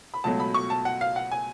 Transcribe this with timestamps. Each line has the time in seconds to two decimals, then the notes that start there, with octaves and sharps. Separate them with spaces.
0.14 B5
0.24 C#2 B2 F#3 A3 A5
0.40 B5
0.54 C#6
0.70 A5
0.85 F#5
1.01 F5
1.16 F#5
1.31 G#5